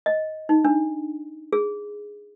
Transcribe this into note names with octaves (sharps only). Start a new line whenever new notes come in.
D#5
D#4
D4
G#4